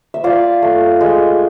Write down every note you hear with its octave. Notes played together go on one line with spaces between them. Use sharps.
E5
F4 D5 F5
A3
G#3